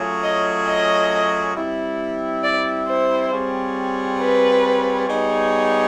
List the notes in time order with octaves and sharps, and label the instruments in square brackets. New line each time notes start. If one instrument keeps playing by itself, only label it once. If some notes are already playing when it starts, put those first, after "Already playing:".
Already playing: [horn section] F#3 A3 C#4 F4 G#4
[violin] D#5
D#5
[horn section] G3 C4 E4
[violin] D5
C5
[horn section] G3 C4 F4 G#4 C#5
[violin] B4
[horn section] G3 B3 D#4 G#4 C#5